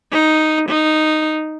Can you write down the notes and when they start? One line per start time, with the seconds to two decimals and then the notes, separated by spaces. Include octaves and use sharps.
0.12 D#4
0.69 D#4